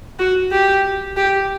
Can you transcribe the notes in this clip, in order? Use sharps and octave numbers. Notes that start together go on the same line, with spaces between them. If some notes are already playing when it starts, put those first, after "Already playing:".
F#4
G4
G4